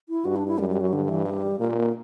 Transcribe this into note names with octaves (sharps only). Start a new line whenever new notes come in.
E4
G2 F#4
D4
E4
F#2 G3
G3
F#3
G2 D3
E3
G3
A#2 A#3
A#3